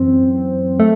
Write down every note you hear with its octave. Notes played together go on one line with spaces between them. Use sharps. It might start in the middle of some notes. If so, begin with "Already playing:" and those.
Already playing: F#2 E3 C4
A3